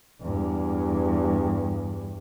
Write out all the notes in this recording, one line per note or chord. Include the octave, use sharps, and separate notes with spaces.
E2 G2